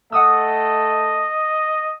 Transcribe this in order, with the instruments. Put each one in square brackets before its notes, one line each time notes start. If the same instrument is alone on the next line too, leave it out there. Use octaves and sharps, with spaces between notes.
[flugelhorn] A3 [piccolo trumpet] D#5 [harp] F#5 D#6 E6